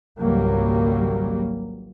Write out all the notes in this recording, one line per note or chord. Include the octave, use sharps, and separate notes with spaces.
G#1 C#2 F#3 G3 A#3